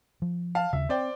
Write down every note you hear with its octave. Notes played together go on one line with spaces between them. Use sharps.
F3
F5 A5
D#2 C#3 E5
C4 C5 D5 G5